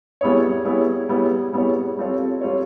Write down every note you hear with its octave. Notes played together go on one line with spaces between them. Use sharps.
G3 B3 E4 G#4 C#5
G3 B3 E4 G#4 C#5
G3 B3 E4 G#4 C#5
G3 B3 E4 G#4 C#5
G3 C4 F4 A4 C#5
G3 C4 F4 A4 C#5